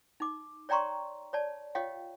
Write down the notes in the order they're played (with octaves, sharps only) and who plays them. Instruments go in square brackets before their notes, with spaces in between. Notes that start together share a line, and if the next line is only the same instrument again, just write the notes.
[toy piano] D#4 D6
C#5 D5 G5 A#5 C6 C#6
C#5 D5 A5
F4 G4 C#5 D#5 F5 G5